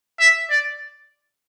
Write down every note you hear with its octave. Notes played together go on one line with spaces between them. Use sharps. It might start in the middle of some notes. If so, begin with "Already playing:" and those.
E5
D5